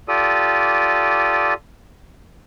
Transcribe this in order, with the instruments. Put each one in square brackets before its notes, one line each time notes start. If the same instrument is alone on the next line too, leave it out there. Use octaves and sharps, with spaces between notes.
[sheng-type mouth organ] F4 G4 A4 D5 D#6